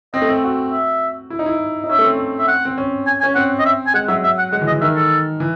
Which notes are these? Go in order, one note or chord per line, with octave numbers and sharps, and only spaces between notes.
C4 D#5
A3
C4
F#4
E5
E4
D#4
E4
D#4
C#4 E5
A3
C4
E5
F#5
C4
C#4
G#5
G#5
C#4
C4 F#5
D#5
E5
G#5
G#3 F#5
F#3 E5
E5
F#5
G#3 F#5
E3
D#5
E3
D#3 E5
A4
E3